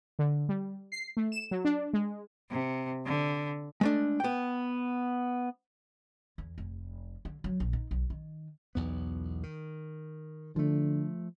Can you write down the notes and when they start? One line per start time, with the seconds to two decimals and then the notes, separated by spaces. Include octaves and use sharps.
0.19 D3
0.49 G3
0.92 C7
1.17 A3
1.32 E7
1.51 F#3
1.65 D4
1.93 G#3
2.50 C3
3.05 D3
3.81 G#3 A3 D4
4.20 B3 G5
6.38 E2
6.58 F1
7.25 D3
7.44 F#3
7.60 A#1
7.73 D#4
7.91 B1
8.10 D#3
8.75 B1 E2 B3
9.43 D#3
10.56 D3 F3 A3